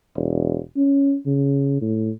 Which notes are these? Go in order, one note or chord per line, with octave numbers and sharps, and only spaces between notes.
E1
C#4
C#3
A2